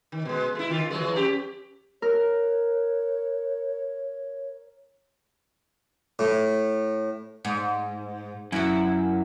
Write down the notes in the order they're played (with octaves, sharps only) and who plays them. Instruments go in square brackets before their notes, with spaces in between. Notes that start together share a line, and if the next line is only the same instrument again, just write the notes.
[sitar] D#3
B2 G#3
A3 E4
D#3 F4
E3 F#3 G#3
F2 C#4 G4
[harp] A#4 [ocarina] C#5
[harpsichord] A2
[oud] G#2
[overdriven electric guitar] F#2 [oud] E4 F#4